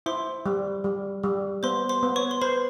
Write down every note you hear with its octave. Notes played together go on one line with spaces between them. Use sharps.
E4 C5 C6
G3
G3
G3
B3 C5 C6
C5 C6
B3
C#5 C#6
C6
B4 C5 B5